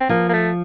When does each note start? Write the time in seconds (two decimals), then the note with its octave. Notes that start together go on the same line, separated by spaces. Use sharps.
0.01 C4
0.09 F3 A#3
0.29 A#3
0.33 A3